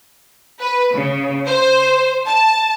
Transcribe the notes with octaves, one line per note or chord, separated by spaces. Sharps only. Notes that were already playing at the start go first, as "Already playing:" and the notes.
B4
C#3
C5
A5